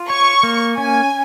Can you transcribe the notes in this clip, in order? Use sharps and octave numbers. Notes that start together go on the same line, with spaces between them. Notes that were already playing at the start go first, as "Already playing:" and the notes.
Already playing: F4
C#5 C#6
A#3
C#4 G#5